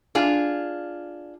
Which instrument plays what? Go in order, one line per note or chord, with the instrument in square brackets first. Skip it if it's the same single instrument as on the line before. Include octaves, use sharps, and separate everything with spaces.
[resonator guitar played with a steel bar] D4 F4 G#4